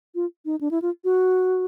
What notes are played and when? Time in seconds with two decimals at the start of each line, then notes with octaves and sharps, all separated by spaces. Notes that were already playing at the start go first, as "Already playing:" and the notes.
0.15 F4
0.45 D#4
0.61 D4
0.71 E4
0.82 F4
1.04 F#4